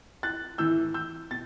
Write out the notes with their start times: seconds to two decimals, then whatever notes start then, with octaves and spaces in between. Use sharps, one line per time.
0.23 F#6 A6
0.58 A2 E3 E6 G6
0.94 E6 G6
1.31 B2 A6